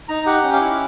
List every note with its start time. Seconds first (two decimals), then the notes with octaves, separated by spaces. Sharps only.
0.09 D#4 A#5
0.26 G4 F#5
0.43 C#4
0.53 F5
0.61 E4